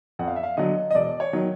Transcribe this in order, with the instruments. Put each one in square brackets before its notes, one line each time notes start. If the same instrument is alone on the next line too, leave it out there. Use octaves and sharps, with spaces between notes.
[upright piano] F2 F#5
F5
E5
F5
D3 F#3 D#5
D#5
E1 D5
C#5
D#3 F#3